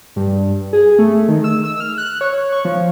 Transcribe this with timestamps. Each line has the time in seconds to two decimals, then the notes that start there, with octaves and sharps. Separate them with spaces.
0.16 G2
0.73 G#4
0.99 A3
1.28 D#3
1.44 E6
1.64 E6
1.80 F6
1.98 F#6
2.21 C#5
2.52 C#6
2.65 F3